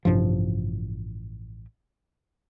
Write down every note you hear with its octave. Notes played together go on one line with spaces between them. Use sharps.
A1 G2 C3 F3